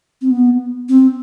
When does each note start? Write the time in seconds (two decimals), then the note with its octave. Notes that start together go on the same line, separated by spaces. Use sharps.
0.22 C4
0.31 B3
0.89 C4